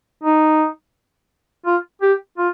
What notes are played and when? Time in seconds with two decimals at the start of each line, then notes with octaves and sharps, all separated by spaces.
0.24 D#4
1.66 F4
2.02 G4
2.38 F4